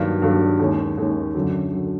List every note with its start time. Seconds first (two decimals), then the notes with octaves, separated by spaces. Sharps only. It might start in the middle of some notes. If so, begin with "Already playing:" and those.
Already playing: G2 D#3 F#3 A#3 D4
0.22 G2 D#3 F#3 A#3 D4
0.59 D#2 D#3 G#3 C#4
0.98 D#2 D#3 G#3 C#4
1.35 F#2 D3 F#3
1.73 D3 F#3